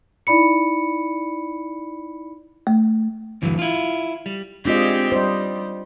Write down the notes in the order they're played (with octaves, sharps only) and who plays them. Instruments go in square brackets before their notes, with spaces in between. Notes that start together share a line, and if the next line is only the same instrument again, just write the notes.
[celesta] D#4 E4 D5 B5 C#7
[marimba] A3
[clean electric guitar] D2 G2 E3 F#3
E4 F4
G3
[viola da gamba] G#3 C4 G4 [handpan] D4 F4 D#5
[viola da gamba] G3 [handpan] C5 D#5